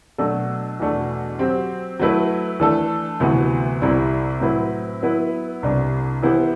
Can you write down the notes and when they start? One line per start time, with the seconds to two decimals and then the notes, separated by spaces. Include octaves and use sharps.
0.18 B2 F#3 A3 D4 A4
0.80 E2 B2 A3 D4 F#4
1.39 F#3 C4 G4 C5
1.99 F#3 A3 E4 B4
2.60 E3 A3 D4 A4
3.20 D2 C3 E3 B3 F#4
3.82 C2 C3 G3 C4 E4
4.41 A2 F#3 C4 E4 B4
5.02 F#3 B3 E4 B4
5.63 C2 C3 G3 D4
6.23 E3 B3 E4 G4 C5